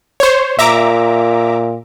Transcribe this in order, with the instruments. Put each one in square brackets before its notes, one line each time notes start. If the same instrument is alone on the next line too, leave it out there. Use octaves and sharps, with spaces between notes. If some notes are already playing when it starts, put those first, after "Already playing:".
[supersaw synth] C5 C#5
[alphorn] A#2 [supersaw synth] E5 A#5 D6